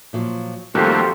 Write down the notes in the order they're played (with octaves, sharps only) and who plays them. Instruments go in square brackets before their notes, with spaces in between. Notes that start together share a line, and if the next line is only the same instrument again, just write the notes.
[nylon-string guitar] A#2 F3 F#3
[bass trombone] F2 [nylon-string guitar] D#3 [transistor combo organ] G3 A3 A#3 [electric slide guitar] F#4 G4 C5